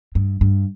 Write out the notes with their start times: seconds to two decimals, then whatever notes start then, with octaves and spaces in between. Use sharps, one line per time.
0.15 G2
0.41 G2